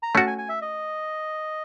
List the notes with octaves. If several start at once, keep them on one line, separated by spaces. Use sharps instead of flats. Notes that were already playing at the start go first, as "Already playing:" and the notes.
A#5
A3 C#4 F#4 A5
G#5
G#5
E5
D#5